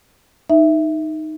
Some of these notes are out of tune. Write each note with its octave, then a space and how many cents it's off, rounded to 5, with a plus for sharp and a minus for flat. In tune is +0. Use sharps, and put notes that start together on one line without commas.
D#4 +0 E5 +0